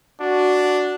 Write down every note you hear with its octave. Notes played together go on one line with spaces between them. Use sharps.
D4 F#4